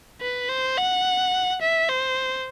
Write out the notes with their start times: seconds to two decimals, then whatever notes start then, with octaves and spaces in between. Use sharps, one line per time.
0.21 B4
0.49 C5
0.77 F#5
1.61 E5
1.89 C5